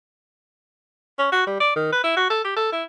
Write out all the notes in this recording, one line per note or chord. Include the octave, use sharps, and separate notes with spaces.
C#4
F#4
G3
D5
D#3
B4
E4
F#4
A4
G4
A4
E4